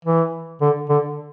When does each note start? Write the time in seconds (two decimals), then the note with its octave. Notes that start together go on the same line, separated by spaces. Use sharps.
0.05 E3
0.62 D3
0.89 D3